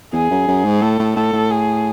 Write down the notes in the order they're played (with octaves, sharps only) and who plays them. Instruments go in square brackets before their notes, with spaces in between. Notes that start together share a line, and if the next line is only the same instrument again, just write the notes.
[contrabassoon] E2 [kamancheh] G#4
[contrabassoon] F#2
F#2
G#2
[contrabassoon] A2 [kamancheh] A4
[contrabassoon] A2
[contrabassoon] A2 [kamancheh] A4
[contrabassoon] A2
[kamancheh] G#4